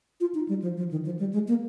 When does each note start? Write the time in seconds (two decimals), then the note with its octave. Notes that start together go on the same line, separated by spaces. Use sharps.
0.20 F4
0.34 D#4
0.48 G3
0.62 F3
0.77 F3
0.91 D#3
1.05 F3
1.19 G3
1.33 G#3
1.48 A#3